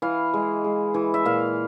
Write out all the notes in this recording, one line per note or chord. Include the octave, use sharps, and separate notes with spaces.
E3 F5
G#3
G#3
E3
E5
A#2 F5